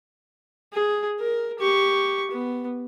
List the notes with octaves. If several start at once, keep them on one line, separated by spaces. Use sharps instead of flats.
G#4
A#4
G4 C#6
B3